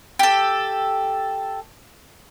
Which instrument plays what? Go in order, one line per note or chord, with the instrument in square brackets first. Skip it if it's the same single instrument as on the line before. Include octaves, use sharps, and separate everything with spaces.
[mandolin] G4 A4